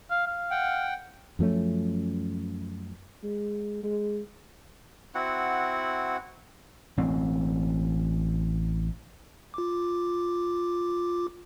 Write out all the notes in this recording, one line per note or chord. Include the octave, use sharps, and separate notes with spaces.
F5
F5
F#5 G5
F#2 F3 A3 C#4
G#3
G#3
C4 E4 F#4 F#5
A1 C4
F4 D6